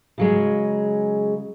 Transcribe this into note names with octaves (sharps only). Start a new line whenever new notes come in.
C#3 F#3 G#3